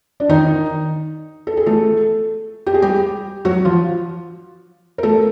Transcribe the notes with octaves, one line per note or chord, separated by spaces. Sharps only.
D4
D#3 D#4
A4
G#4
A3 A4
G4
G#4
G3 G4
F#3 F#4
F3 F4
A#4
A3 A4